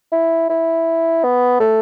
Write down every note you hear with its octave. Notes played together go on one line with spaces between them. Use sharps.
E4
E4
B3
A3